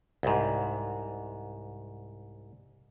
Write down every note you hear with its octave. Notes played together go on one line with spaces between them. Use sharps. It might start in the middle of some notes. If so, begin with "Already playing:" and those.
C2 G#2